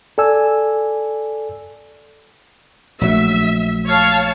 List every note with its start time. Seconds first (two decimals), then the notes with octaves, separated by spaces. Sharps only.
0.18 A4 D5 G#5 E6
3.01 A#1 F#3 A3 E5
3.86 C#5 F5 A5